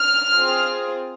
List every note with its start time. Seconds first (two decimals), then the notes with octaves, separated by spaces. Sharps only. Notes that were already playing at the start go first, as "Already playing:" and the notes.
Already playing: F6
0.32 C4 F4 G#4